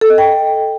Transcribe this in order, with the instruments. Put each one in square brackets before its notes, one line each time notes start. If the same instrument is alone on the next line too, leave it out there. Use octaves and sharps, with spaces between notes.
[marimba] A4
D#5
G5